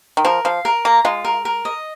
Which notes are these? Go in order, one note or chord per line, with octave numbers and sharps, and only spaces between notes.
D#3
F3 A#4
F3 F5
A#4
A#3 A#5
G#3 F4
A#4
A#4
D#5